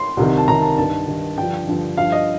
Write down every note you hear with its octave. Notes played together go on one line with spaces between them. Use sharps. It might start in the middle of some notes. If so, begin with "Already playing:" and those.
Already playing: C6
C2 C3 D#3
A5
C2 C3 D#3 A#5
A5
G2 D#3 A5
G2 D#3
G2 D3 F3 G5
G2 D3 F3
G2 F3 F5
D#5